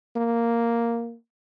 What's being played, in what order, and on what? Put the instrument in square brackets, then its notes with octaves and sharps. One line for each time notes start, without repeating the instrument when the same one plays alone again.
[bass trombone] A#3